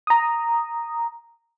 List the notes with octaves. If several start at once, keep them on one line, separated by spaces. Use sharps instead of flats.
A#5 D#6